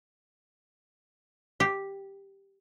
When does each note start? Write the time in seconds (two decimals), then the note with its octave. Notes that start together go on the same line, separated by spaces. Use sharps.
1.60 G4